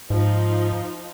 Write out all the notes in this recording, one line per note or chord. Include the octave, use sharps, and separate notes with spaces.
G#2 F3 D#4